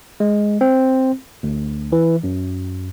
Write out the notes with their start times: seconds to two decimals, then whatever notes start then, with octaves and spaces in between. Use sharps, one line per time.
0.20 G#3
0.61 C4
1.43 D2
1.92 E3
2.24 F#2